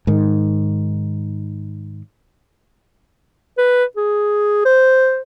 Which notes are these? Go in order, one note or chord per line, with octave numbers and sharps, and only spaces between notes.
G#2 D#3
B4
G#4
C5